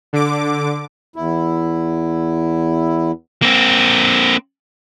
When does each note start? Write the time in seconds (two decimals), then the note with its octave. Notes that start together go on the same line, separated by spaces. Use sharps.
0.13 D3 D6
1.16 E2 E4
3.42 A#3 C4